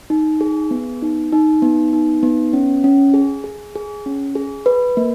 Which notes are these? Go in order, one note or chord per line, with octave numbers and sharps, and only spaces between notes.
D#4
G#4
B3
D#4
D#4
B3
D#4
B3
C#4
C#4
G#4
G#4
G#4
C#4
G#4
B4
A#3